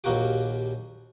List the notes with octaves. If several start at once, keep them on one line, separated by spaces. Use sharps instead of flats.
A#1 D#2 A#2 A#3 F#4 G4